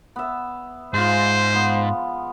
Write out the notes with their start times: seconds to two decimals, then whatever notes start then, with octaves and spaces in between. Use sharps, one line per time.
0.16 B3 E5
0.94 G#2 G#3 F4 C5
1.52 F3 B3